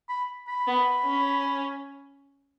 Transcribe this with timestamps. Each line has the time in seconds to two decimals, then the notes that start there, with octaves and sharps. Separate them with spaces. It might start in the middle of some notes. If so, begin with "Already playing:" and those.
0.09 B5
0.48 B5
0.67 B3
1.04 C#4